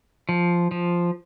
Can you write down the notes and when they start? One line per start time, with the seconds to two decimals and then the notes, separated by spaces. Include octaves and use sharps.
0.29 F3
0.71 F3